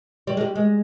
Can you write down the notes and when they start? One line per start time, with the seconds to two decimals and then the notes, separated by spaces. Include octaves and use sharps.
0.27 G3
0.37 G#3
0.41 G3
0.55 G#3